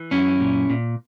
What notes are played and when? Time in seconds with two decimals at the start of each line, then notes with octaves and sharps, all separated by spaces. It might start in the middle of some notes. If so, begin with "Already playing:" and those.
Already playing: E3
0.11 F#2 C#4 E4
0.40 A#2
0.70 A#2